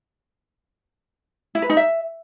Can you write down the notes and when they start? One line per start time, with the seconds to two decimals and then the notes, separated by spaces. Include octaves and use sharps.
1.55 E4
1.62 B4
1.70 D#4
1.77 E5